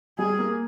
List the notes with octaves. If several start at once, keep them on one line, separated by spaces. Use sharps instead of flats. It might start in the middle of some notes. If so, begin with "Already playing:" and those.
G3 G#4
A#3